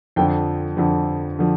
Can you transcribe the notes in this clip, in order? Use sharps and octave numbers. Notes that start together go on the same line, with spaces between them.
F2 D3 F3 G5
F2 D3 F3
D3 F3